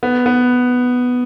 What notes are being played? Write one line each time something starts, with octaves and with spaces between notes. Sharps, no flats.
B3
B3